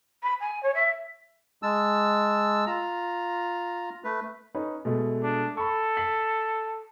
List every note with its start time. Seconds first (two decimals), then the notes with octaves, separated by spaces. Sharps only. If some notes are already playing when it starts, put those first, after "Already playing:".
0.23 B5
0.41 G#5
0.63 C#5
0.75 E5
1.63 G#3 A5 E6
2.66 F4 A#5
4.04 A3 B4
4.55 C#4 D#4 B4
4.85 B2 G#3 A3
5.23 D4
5.57 A4 B5 C#6
5.97 B6 C7 F#7